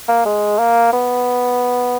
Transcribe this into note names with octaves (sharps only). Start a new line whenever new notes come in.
A#3
G#3
A#3
B3